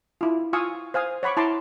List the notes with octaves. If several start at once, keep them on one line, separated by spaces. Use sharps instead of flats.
E4 F4
F4 F5 G#5 C#6 D#6 E6
C5 F5 G#5 D#6
C#5 F#5 B5 C#6 D6
E4 A5 A#5 C6 D6